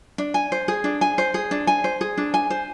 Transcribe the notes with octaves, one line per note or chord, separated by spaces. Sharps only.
D4
G#5
C5
G#4
D4
G#5
C5
G#4
D4
G#5
C5
G#4
D4
G#5
C5